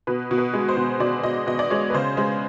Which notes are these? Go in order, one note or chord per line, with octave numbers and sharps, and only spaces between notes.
B2 B4
B2
B4
G#3
C5
B2
B2 D5
B2 D#5
B2 D#5
D5
G#3 C#5
B4
C#3 C5
G#3